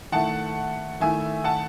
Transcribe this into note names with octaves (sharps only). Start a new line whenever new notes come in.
D#3 A3 E4 F#5 A5
D#3 A3 E4 E5 G#5
F#5 A5